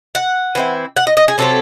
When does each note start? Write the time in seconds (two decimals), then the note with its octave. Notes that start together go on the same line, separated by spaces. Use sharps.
0.15 F#5
0.55 E3 C4 E4
0.97 F#5
1.07 D#5
1.17 D#5
1.28 G#4
1.38 C3 F#3 C4 A4